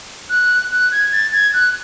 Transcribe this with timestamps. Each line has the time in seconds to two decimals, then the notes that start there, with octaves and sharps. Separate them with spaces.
0.30 F#6
0.72 F#6
0.92 G#6
1.12 A6
1.33 G#6
1.54 F#6